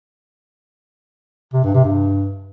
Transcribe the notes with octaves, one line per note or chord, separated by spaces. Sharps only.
C3
G2
C3
G2